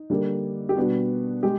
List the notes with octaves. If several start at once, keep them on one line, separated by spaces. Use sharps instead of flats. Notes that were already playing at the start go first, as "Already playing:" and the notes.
Already playing: D#4
D3 G3 A#3
G4
B2 G3 B3 D4 F#4
G#3 G4